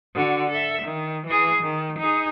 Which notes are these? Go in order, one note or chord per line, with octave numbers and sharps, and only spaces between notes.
D3 F#4
A4 E5
D#3
E3 G#4
D#3
D#4 G#4